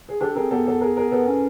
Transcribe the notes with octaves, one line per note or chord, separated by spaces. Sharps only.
G#4
D4 G4 A4
C4 G#4 A#4
B3 G4 A4
G4 A4
G#4 A#4
G#4 A#4
B3 A4 B4
C#4